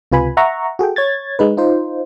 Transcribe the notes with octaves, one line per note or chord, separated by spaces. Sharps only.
C#2 C3 F4 B4 G#5 B5
E5 F#5 A#5 C#6
F#4 G#4 A4 G5
C#5 G#6 A6
G#3 D#4 B4
D#4 F4 C5